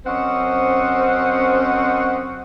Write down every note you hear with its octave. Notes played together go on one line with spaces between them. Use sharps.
F#2 C4 C#4 C5 D#5 F#5